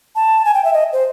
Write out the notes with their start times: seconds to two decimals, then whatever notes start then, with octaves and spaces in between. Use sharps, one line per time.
0.15 A5
0.45 G#5
0.54 G5
0.64 E5
0.73 D#5
0.93 C5